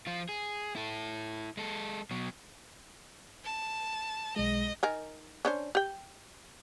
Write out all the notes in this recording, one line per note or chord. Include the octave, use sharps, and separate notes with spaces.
F3 F4
G#4
E4 A4
G#3 A4
B2 F#3
A5
B1 G#3 D#5
D#3 A#4 G#5
C#4 D4 C5
G4 G5